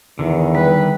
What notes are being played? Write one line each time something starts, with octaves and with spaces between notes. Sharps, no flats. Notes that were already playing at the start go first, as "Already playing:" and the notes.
E2 D3 D#3
G3 B4